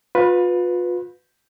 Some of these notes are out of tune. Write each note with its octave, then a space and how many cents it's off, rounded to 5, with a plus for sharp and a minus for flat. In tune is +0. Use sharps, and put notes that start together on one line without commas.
F4 +35 B4 +0